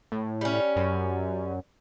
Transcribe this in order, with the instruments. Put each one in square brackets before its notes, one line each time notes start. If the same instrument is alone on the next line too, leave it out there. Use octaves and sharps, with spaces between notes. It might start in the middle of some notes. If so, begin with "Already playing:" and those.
[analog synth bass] A2
[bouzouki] G3 C#4
[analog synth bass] F#2